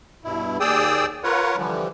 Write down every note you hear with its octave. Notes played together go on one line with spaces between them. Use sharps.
G2 B2 E4
D#2 G#4 D5 G5 D#6 E6
F4 A#4 B4 C#5 F#5
D3 E3 F3 G3